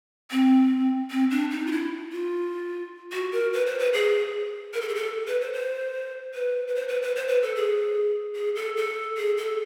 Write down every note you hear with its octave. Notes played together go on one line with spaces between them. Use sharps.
C4
C4
D4
D#4
F4
E4
F4
F#4
A#4
B4
C5
B4
G#4
A#4
A4
G#4
A4
B4
C5
C5
B4
B4
C5
B4
B4
C5
B4
A4
G#4
G#4
A4
A4
G#4
A4